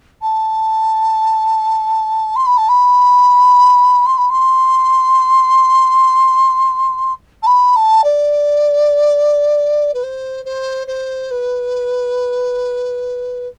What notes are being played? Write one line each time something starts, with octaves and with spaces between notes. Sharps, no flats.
A5
C6
B5
A5
B5
C6
B5
C6
A5
B5
A5
D5
B4
C5
C5
C5
B4